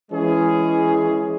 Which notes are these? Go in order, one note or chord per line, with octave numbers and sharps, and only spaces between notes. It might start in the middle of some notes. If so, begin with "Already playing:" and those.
E3 G#3 C#4 G#4